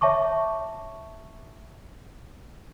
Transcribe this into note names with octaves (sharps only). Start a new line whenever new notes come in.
C#5 E5 A5 C#6 D6